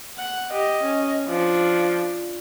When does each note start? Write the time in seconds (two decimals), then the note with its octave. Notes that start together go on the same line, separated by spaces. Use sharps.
0.18 F#5
0.53 G4 D#5
0.83 C#4
1.29 F3 D4